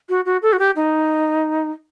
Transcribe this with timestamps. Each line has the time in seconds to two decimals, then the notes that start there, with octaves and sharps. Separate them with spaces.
0.09 F#4
0.26 F#4
0.42 A4
0.53 F#4
0.59 G4
0.76 D#4